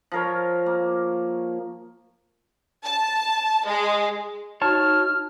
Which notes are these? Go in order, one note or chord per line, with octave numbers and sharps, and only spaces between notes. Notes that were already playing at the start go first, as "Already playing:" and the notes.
F3 A#4 C#5
A#3
A5
G#3
D#4 F#4 C#5 A5 F6